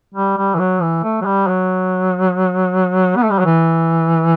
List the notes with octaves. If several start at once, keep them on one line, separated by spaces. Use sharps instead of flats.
G3
G3
E3
F#3
E3
A3
F#3
G3
F#3
B3
A3
G3
F#3
E3